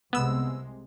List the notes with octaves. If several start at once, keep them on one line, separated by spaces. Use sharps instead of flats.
C2 C3 G#3 B3 E6